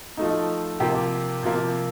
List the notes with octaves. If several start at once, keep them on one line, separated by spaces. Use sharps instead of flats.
F3 A3 D#4
C3 F3 A#3 G4
C3 F3 A#3